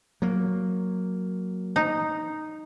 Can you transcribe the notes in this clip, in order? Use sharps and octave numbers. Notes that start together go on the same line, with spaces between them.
F#3 A#3
D#4